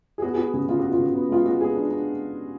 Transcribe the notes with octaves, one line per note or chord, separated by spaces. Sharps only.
G#4
B3 F#4
G#4
B3 F#4
C#3 G#4
C#3 F4
F#4
B3
F4
C#3 F#4
B3
G#3 F4
G#3 F#4
B3 G#4
D4
D4